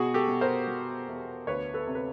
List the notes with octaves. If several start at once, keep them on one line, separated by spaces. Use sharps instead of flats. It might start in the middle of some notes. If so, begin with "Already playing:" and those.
Already playing: B2 F#4 G#4
G4 A4
B2
A#4 C5
B2
E2
D2 B4 C#5
A4 B4
C3
B4